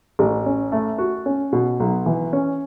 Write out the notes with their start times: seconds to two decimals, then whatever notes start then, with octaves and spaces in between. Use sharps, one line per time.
0.19 A1
0.46 C#4
0.72 A3
0.98 F#4
1.26 C#4
1.53 B2
1.80 B1
2.06 E3
2.33 C#4